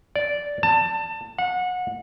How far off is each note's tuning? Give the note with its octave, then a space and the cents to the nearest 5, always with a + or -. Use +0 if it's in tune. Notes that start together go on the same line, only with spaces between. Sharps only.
D5 -10
A5 +20
F#5 -25